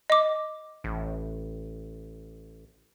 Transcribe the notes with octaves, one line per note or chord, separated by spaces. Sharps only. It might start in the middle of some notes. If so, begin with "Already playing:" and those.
D#5 D6
A1